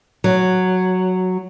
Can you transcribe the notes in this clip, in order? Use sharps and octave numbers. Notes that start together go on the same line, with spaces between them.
F#3